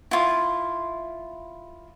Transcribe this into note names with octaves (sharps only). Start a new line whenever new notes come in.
E4 F4